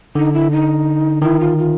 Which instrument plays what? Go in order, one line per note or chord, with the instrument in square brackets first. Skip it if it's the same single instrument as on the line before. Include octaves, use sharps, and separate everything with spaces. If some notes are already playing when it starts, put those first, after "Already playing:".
[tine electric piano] D3 [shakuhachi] D#4
[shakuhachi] E4
D#4
[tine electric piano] D#3 [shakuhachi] E4
[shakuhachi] F4
F4